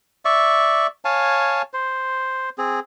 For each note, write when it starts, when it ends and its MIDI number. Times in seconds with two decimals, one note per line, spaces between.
0.25 0.87 74
0.25 0.87 76
0.25 0.87 85
1.05 1.62 73
1.05 1.62 77
1.05 1.62 80
1.05 1.62 81
1.73 2.49 72
2.58 2.80 60
2.58 2.80 68